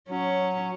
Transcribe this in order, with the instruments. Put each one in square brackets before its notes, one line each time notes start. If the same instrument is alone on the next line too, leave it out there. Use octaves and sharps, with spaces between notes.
[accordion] F#3 [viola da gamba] C#4